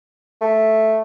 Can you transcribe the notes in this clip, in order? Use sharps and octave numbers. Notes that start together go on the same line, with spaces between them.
A3